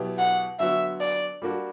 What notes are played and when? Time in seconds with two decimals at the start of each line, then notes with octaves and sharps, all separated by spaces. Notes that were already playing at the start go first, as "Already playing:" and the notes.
Already playing: B2 F#3 B3 E4 G4
0.19 F#5
0.59 D3 F#3 B3 F#4 E5
1.01 D5
1.42 G3 A#3 D4 F#4